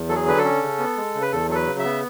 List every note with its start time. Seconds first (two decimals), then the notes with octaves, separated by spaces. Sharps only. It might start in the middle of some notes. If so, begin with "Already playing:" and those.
Already playing: E2
0.09 F#3 A4
0.15 G#4
0.26 D3 B4
0.38 A4
0.44 C#4
0.62 C#3
0.79 B3
0.97 G#3
1.15 C#3
1.21 B4
1.32 E2 A4
1.49 F#3 A4
1.55 B4
1.67 C#3
1.79 E5
1.84 B3